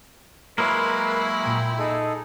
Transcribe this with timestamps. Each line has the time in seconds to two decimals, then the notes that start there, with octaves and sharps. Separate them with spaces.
0.58 F#3 G#3 A#3 E4 A#4 B4
1.43 A#2 G5
1.78 D#4 G#4 A4